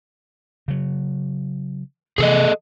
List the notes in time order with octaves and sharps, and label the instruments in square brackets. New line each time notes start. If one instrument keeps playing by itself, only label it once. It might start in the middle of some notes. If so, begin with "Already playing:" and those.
[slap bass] C#3 F#3
[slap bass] C3 E3 F3 [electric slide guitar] G#4 A4 D#5